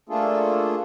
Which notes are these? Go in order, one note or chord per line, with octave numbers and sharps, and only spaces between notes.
A3 A#3 D4 F4 G#4 A4